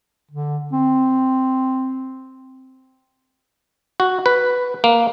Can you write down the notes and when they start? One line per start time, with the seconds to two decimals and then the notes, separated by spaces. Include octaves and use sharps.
0.31 D3
0.72 C4
4.00 F#4
4.26 B4
4.84 A#3